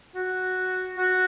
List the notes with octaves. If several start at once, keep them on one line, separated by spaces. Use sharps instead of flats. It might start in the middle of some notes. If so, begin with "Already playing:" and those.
F#4
F#4